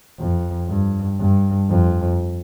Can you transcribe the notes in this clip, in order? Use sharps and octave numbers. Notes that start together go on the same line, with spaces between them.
F2
G2
G2
F2